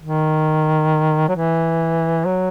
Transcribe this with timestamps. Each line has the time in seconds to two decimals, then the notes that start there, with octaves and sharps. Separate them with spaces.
0.01 D#3
1.29 F#3
1.35 E3
2.25 F#3